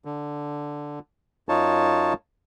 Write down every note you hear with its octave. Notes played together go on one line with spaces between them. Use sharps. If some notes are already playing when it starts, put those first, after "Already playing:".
D3
F#2 D#4 F4 C#5 A5